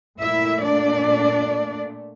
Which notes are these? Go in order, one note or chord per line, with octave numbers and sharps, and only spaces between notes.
A#2 A3 E4 E5
D4 D5